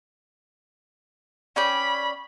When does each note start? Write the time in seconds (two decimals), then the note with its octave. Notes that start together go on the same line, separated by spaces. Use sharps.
1.56 C#4 D5 G5 B5